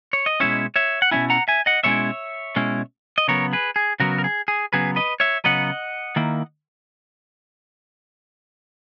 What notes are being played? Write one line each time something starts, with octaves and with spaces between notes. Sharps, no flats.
C#5
D#5
B2 G#3 C#4 E4 C#5 E5
C#5 E5
F#5
B2 G#3 C#4 E4 E5 G#5
F#5 A#5
E5 G#5
D#5 F#5
B2 G#3 C#4 E4 C#5 E5
B2 G#3 C#4 E4
D#5
C#3 F#3 B3 A#4 C#5
G#4 B4
G#4
C#3 F#3 B3 F#4 A#4
A#4
G#4
G#4
C#3 F#3 B3 G#4 B4
B4 D#5
C#5 E5
C#3 F#3 B3 D#5 F#5
D#3 A#3 E4